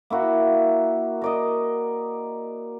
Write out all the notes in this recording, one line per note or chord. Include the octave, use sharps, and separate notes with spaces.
A#3 E4 F#4
A#4 D5 D#5